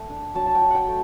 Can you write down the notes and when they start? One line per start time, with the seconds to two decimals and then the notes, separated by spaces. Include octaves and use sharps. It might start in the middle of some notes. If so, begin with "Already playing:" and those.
Already playing: A3 G5
0.09 D4
0.35 F#3 A5
0.46 A5
0.55 G5
0.62 F#3
0.70 F#5 G5
0.88 A3